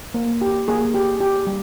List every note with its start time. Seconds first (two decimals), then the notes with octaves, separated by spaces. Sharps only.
0.14 A#3
0.41 G4
0.68 A#3 G#4
0.94 G4
1.20 G4
1.47 G3